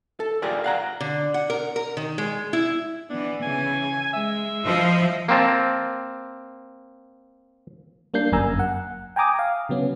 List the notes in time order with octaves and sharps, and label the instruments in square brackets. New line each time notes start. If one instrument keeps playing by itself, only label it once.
[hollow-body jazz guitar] A4
F4 G4 G#4 A#4 D5
F5 F#5 A#5
[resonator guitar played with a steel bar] D3
F#5
A#4
A#4
D#3
G#3
E4
[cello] E3 B3 [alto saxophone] D4
[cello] C#3 E3 [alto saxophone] G#5
[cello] G#3 [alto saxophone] E5
[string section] F3 [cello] E4 D#5
[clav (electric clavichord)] A#3 C4 A5
[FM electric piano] G3 A#3 D4 G6 C7
G1 F#2 A#3 G#5 A#5 E6
F#5
G5 G#5 A#5 D6 D#6
F5
C#3 F#3 B3 C#4